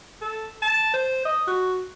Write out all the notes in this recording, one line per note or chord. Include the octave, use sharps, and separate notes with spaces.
A4
A5
C5
D#5
F#4